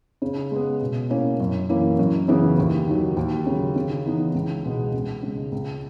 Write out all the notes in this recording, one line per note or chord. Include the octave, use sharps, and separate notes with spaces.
C#3
G#3 B3
B2
A#3 C#4 E4
F#2
E3 A#3 C#4 E4
F#2
C#3 E3 B3
D#2
D#3 F#3
D#2
C#3 F#3
C#3
E3 B3 D#4
C#2
B2 G#3 B3
C#2
C#3 G#3
C#2